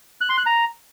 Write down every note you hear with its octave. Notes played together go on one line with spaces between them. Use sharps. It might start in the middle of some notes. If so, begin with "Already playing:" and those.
F#6
C6
F#6
A#5